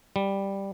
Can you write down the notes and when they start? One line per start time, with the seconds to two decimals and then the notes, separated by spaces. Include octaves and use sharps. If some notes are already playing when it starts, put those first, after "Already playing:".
0.16 G3